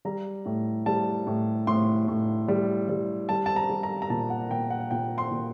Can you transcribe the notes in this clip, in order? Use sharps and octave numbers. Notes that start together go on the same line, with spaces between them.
G3 A#5
A2
G3 A5
A2
A2 C6
A2
G3
G3
G3 A5
A5
A#5
G3
A#5
A#5
A#2 A5
F#5
A#2 G5
F#5
A#2 G5
C6
A#2